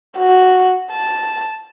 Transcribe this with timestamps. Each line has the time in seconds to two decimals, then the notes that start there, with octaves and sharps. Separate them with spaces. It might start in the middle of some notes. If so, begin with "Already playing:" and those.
0.18 F#4
0.92 A5